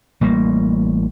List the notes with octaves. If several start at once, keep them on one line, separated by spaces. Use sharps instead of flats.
A1 G3 A#3